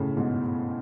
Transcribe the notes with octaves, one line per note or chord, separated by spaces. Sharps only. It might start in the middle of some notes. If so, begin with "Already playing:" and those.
Already playing: A2 C#3
G#2 B2